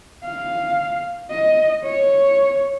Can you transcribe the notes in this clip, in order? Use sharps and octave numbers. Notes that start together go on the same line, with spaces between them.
F5
D#5
C#5